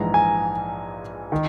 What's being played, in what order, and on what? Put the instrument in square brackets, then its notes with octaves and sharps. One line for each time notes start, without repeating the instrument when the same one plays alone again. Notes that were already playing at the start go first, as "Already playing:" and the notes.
Already playing: [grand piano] A#1 G#2 E3 A#5
G#5
D#3